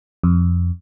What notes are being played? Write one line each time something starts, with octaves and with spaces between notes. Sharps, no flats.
F2